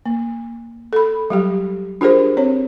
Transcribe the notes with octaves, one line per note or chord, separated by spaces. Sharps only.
A#3
A4 B5
F#3 G3 G4
D4 F4 G4 G#4 A#4 C5
C4 C#5